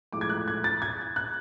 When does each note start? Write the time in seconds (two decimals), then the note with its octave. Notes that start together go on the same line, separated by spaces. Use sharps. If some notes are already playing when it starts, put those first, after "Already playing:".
0.13 A2 F3 G#3 D6
0.21 G#6
0.30 F#6
0.48 G#6
0.64 A6
0.82 G#6
1.16 F#6